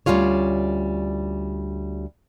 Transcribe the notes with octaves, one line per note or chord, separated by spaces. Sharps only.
D2 A#2 G3 C#4 F4 C#5